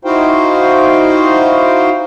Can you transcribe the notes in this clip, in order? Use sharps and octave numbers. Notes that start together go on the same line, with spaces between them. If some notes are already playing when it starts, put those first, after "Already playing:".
D#4 E4 F#4 C5 F5 G5